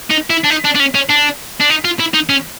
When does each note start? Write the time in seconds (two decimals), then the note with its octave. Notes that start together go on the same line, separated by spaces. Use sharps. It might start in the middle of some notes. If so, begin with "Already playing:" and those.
0.11 D#4
0.30 E4
0.44 D4
0.50 D#4
0.65 D4
0.75 D4
0.80 C#4
0.95 C#4
1.10 D4
1.61 D4
1.70 D#4
1.85 F4
2.00 E4
2.14 D#4
2.29 C#4